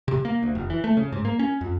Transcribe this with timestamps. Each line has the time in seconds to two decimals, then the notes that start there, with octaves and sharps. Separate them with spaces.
0.08 C3
0.25 A#3
0.43 D2
0.55 F1
0.70 E3
0.84 A3
0.97 C#3
1.12 G#2
1.25 A#3
1.39 C#4
1.61 F2